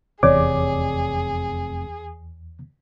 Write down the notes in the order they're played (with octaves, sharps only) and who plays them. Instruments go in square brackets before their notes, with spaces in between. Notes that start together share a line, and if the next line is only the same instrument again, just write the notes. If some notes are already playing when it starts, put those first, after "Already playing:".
[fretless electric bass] F1 C3 [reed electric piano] E2 D6 [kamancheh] G#4 [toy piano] C#5 D5